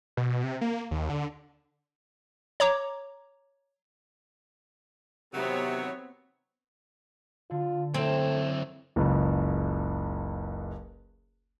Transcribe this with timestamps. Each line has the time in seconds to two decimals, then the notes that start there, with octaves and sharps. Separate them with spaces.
0.17 B2
0.44 C3
0.61 A#3
0.91 D#2
1.10 D3
2.60 C#5 A#5 D6
5.34 C3 D#3 E3 F#3 B3 C4 C#5
7.51 D3 F4
7.94 F#2 A3 C4 E4
8.96 F#1 C#2